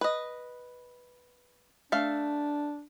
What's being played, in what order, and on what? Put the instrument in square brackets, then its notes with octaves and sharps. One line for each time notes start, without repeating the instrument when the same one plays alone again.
[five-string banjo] B4 D#5
[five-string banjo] A3 F5 [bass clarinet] D4